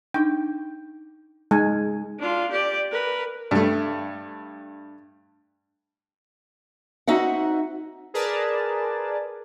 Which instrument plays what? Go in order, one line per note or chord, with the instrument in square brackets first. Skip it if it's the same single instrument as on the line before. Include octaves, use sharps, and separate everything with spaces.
[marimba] D4 D#4 [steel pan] G5
[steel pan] G#3 G#5 [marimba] D#4
[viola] D4 F4
G4 D5
A#4 B4
[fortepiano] G2 A3
[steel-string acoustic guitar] C4 D#4 F#4 E5 F#5
[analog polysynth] G#4 A#4 B4 D5 A5